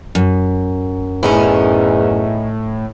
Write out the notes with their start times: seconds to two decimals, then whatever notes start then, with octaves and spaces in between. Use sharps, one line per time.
0.15 F#2
1.23 E2 A2 C#4 D#4 E4